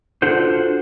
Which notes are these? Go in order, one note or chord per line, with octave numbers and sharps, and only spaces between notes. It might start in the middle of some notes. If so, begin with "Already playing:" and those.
D4 F4 F#4 A4 C5